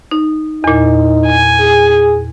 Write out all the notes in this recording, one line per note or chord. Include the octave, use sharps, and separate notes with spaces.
D#4
E2 A#2 D#4
G#5
G#4